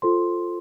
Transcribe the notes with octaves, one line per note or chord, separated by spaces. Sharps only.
F4 A4 C5 C6